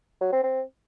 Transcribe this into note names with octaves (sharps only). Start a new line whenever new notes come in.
F#3
C4
C4